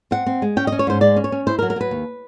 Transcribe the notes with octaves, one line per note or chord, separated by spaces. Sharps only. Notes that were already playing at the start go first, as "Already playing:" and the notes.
C4 F#5
C4
G#3
C#4 G5
D#5
C#4
C#5
G#2 C5
G#3 D5
C#4
C#5
C#4
E4 C5
A#4
F#3
A#4
F#3 B4
D#2